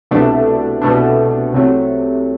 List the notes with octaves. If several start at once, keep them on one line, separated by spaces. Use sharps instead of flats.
C2 B2 A3 D4
C2 B2 A3 D4
C2 C3 F#3 A3